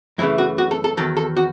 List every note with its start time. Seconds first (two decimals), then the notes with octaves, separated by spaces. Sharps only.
0.18 F#2 C#3 E3 A3 E4
0.38 F#4
0.58 F#4
0.71 A4
0.84 A4
0.97 E2 D#3 F#3 A4
1.17 A4
1.37 F#4